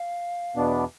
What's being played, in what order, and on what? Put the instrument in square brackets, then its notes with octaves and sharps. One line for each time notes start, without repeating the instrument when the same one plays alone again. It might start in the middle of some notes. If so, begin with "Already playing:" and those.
Already playing: [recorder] F5
[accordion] E2 B2 B3 D4